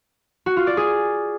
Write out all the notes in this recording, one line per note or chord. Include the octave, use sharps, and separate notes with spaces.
F#4
F4
D5
G#4